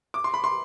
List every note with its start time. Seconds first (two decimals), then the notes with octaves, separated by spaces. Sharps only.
0.14 D6
0.24 C6
0.34 B5
0.44 C6